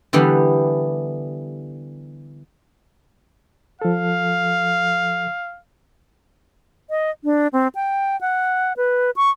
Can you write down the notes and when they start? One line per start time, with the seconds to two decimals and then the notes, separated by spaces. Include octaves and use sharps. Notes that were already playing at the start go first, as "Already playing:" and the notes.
0.13 D3 E3 G3 B3 G4
3.82 F3 A4 F5
6.90 D#5
7.24 D4
7.53 C4
7.75 G5
8.21 F#5
8.77 B4
9.16 C#6